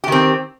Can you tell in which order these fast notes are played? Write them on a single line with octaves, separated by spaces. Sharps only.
G4 D#3 C4